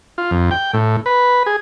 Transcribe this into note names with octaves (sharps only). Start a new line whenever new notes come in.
F4
F2
G5
A2
B4
G#4